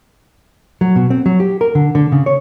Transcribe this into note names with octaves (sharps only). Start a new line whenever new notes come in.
F#3
B2
C4
F#3
G4
A#4
D3
D3
C#3
C#5